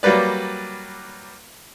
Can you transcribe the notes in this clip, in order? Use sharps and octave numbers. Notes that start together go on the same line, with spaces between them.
F#3 G3 A#3 B4 D5